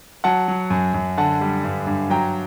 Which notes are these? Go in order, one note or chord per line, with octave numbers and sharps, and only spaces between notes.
F#3 F#5 A5
F#3
F#2
F#2
D3 F#5 A5
G3
G2
G2
F#3 G5 A#5